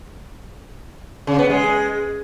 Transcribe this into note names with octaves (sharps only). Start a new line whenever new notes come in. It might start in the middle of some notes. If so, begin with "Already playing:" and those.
C#3
B3
G#3